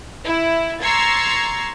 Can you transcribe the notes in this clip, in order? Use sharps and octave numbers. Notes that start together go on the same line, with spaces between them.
E4
A#5 C6 C#6 E6 G#6 A6